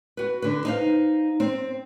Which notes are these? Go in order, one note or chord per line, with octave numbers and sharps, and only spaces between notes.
F#4 B4
D3 B4
D#4 C5 F5
C4